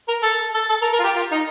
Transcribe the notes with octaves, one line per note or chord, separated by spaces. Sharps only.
A#4
A4
A4
A4
A#4
A#4
F4
G4
F4
D#4